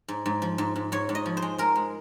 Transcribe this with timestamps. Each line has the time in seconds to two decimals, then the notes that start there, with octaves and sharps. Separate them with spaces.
0.08 G#2
0.26 G#2
0.42 F3
0.58 G#2
0.76 G#2
0.92 G#2 C#5
1.09 G#2
1.15 D#5
1.26 F3
1.37 C5
1.42 G#3
1.58 G#3 A#4
1.75 G#3